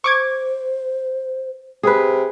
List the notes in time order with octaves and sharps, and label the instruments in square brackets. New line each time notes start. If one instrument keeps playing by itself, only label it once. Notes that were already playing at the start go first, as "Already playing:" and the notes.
[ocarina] C5 [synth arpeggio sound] C#6 D6 G#6
[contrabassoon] C3 [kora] G#4 B4